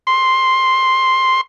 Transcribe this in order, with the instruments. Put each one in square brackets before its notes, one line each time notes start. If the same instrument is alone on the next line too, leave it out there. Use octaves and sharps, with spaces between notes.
[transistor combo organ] C6